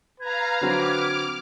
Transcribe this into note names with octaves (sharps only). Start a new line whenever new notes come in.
B4 F5 A#5 G#6
D3 F#3 C4 D6 F6